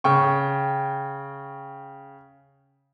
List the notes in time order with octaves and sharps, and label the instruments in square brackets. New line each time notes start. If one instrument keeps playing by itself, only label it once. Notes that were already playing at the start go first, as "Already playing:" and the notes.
[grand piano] C#3 G5 C#6